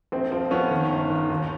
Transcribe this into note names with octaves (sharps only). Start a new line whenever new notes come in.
A#1 C4
F3 C4
F3 B3 C#4
D#3
G1
D#3
D#2